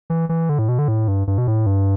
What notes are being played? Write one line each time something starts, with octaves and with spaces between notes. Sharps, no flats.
E3
E3
D3
A2
B2
D3
A2
G2
G2
B2
A2
G2